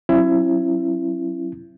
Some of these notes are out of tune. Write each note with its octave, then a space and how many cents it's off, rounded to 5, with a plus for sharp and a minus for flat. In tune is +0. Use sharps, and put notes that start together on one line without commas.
F#3 +0 C#4 -45 E4 +25